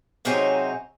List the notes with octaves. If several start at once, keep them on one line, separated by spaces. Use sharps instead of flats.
G#2 C3 F#3 C4 C#4 D#4